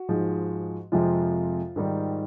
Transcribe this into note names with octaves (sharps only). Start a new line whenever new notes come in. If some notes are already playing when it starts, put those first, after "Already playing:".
Already playing: F#4
G#2 F3 G#3
F2 C3 F3 G#3 F4
G#2 D#3 G3